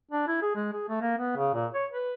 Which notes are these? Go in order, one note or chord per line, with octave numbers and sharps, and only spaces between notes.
D4
E4
G#4
G#3
G#4
A3
A#3
B3
C#3
A#2
C#5
B4